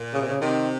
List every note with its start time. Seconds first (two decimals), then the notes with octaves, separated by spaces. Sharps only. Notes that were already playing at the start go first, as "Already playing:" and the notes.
Already playing: A#2
0.13 C#3
0.22 C3
0.29 C#3
0.40 C3 D#3